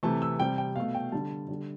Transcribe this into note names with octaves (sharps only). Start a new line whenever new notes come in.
C3 E3 A3 A5
E6
C3 G3 G5
G5
B2 A3 F5
G5
D3 G3 A5
D3 G3